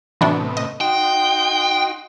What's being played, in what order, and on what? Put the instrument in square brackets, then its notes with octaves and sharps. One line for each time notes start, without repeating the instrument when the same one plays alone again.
[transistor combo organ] A2 C3 B3 [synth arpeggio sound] E3 D4 F#4
[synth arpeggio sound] D#5
[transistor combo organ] D#4 F#4 C6 [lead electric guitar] G5